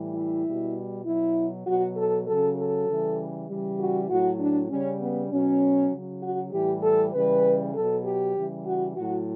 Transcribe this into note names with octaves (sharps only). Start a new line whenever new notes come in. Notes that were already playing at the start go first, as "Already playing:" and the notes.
Already playing: A2 E3 G3
E4
B2 G3
B2 F#3 E4
B2 F#3 F#4
A4
C#3 F#3 A4
A4
C#3 E3 G3
C#3 E3 G3
F#4
A2 F#3 F#4
D4
C#3 G3 C#4
B3
B2 F#3 C#4
C#3 F#3
F#4
A2 E3 G3 G4
A4
C#3 E3 G3 B4
B2 F#3 A4
G4
C#3 E3 G3
F#4
A2 F#3 F#4